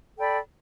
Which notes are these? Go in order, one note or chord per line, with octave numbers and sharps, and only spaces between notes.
A4 D5 G5 B5